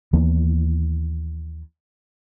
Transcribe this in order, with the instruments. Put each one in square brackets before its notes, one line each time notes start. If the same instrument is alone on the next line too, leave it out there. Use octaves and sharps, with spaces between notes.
[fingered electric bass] D#2 E3 A#3 B3